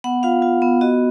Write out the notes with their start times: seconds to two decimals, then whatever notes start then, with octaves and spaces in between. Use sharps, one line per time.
0.04 B3 F#5
0.23 F4 F5
0.42 F4
0.62 B3
0.81 F#4 D#5